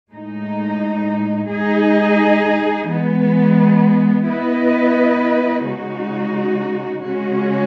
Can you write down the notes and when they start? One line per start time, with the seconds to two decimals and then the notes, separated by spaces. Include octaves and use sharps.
0.10 A2 G#3 D#4
1.49 G#3 D#4 G#4 D#5
2.87 E3 G#3 B3
4.26 B3 E4 B4 D#5
5.65 C#3 G#3 D#4 F#4
7.03 C#3 G#3 C#4 F#4